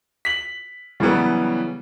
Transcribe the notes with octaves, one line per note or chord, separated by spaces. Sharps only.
B6 F#7
C#3 E3 F#3 G3 B3